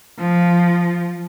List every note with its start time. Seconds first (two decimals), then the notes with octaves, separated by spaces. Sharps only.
0.19 F3